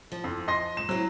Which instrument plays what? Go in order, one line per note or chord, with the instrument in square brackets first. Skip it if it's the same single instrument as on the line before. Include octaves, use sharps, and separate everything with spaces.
[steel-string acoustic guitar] F3
[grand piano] F2
D#5 C6 A#6
[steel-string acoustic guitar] G#2 [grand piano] E7
[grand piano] F#3 [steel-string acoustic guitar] C4 E4